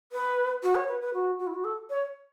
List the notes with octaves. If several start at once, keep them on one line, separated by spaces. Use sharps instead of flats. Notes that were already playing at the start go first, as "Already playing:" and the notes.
B4
F#4
C#5
B4
B4
F#4
F#4
E4
F#4
A4
C#5